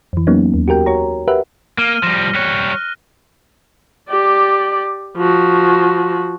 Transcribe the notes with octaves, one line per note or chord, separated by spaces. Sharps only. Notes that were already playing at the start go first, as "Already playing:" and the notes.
F2 E3
F#3 A#3 B3 C#4 D#4
D#2
F#4 G4 A#4 G5
F#4 C#5 A#5
G4 A#4 B4 E5 F#5
A#3 F6 D#7 G7
F3 G3 A#6
G3 C#5 F#6
F6
G4 D5
F3 F#4